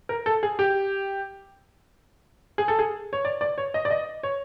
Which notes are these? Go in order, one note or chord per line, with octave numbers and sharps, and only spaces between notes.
A#4
A4
G#4
G4
G#4
A4
G#4
C#5
D5
D5
C#5
D#5
D5
D#5
C#5